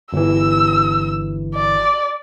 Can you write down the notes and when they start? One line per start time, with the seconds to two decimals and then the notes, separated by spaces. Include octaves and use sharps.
0.13 G1 E3 E6
1.55 D5